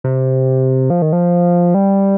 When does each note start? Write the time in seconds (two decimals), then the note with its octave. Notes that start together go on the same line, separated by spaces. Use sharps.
0.04 C3
0.90 F3
1.02 D#3
1.13 F3
1.74 G3